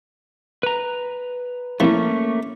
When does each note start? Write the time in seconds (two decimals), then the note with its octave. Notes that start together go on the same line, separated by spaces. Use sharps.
0.63 B4 A#5
1.80 C2 F3 A3 A#3 C#4